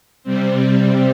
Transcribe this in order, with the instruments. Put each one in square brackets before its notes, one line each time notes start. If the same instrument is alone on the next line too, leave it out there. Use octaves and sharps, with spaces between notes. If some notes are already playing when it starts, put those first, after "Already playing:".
[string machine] C3 G3 C4